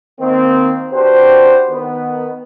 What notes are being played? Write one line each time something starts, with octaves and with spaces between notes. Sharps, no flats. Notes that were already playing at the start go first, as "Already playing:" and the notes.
D#3 A#3 C4
D4 F#4 G4 B4 C5
D#3 B3